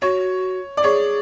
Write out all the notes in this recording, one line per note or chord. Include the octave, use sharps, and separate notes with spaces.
F#4 C#5
D5
G#4 C#5